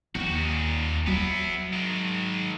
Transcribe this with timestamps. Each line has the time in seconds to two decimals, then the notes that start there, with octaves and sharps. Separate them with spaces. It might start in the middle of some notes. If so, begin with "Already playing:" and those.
0.15 D#2 F#4 G4
0.35 A#2 D#4
1.07 F#3 B3 E4
1.73 D#3 G#3